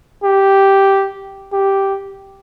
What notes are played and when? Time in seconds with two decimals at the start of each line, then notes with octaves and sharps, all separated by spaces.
0.24 G4
1.53 G4